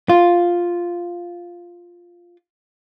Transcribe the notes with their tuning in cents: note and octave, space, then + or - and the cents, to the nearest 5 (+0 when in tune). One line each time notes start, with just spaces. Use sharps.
F4 +0